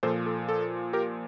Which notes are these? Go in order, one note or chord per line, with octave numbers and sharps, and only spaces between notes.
A#2 F3 A4 C5
A4
A4
G4 A#4